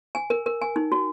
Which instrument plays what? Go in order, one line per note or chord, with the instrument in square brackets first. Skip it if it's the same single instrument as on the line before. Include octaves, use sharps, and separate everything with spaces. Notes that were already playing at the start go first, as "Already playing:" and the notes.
[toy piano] G#5
A#4
A#4
G#5
D#4
F#4